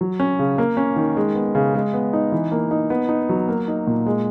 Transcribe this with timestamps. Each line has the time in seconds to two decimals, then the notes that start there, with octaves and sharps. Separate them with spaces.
0.01 F#3
0.20 C#4
0.39 C#3
0.58 A#3
0.77 C#4
0.96 D#3
1.17 G#3
1.35 B3
1.55 C#3
1.75 G#3
1.93 B3
2.13 D#4
2.32 E3
2.52 A#3
2.71 D#4
2.90 B3
3.09 D#4
3.29 F#3
3.48 A#3
3.68 D#4
3.87 A#2
4.06 G#3